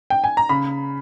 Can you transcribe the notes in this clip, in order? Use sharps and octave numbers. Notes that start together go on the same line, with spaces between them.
G5
G#5
A#5
C#3 B5